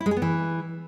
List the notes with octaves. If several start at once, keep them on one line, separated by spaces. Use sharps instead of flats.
E4
G#3
G#4
B3
E3